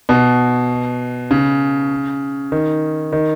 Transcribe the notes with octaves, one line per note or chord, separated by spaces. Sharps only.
B2
C#3
D#3
D#3